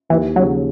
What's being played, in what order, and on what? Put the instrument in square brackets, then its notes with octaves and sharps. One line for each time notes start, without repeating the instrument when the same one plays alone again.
[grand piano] D#2 [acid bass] E3
[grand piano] C#3 F3 [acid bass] F#3